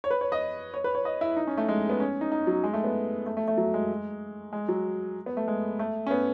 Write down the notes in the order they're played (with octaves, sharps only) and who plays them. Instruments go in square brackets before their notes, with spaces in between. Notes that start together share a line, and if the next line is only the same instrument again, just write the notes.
[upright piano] C#5
B4
C#5
D#5
C#5
B4
C#5
D#5
E4
D#4
C#4
A3
G#3
B3
C#4
D#4
D#4
F#3
G#3
A3
B3
A3
A3
A3
F#3
G#3
G#3
F#3
B3
A3
G#3
A3
C#4
B3